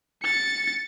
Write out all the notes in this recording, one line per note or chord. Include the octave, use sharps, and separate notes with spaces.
A6 C#7